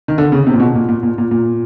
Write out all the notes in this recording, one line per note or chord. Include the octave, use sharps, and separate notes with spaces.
D#3
D3
C#3
C3
A#2
B2
A#2
A#2
A#2
A#2
A#2